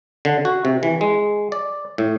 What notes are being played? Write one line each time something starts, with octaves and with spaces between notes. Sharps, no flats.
D3
F#4
C3
E3
G#3
D5
A2